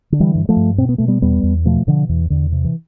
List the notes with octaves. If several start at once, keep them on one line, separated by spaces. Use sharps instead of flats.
D3
E3 G3
G2
F3 A3
G2
B2 C4
B3
B2 A3
G3 B3
E2 G3 B3
E2
B2 F3 A3
B2 D3 F3
E2 E3
E2 D3
C3
E3